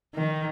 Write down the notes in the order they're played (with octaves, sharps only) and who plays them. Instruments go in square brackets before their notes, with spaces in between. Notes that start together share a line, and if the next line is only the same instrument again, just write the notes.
[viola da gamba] D#3